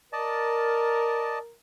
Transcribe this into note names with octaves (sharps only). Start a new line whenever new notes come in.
A#4 D5 D#5 A5